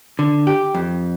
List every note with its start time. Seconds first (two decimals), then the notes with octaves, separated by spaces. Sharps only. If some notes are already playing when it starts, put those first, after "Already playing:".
0.19 D3
0.47 G4
0.74 F2